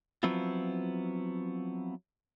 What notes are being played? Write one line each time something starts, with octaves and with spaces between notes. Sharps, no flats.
F3 F#3 B3 C4 E4 F4